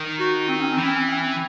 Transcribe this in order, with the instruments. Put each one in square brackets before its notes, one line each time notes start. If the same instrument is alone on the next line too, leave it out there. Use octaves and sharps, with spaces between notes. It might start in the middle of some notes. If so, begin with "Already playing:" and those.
Already playing: [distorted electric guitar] D#3
[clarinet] F#4
C4
C#4
C4
[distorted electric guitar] E3
[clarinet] C#4
C4
C#4
C4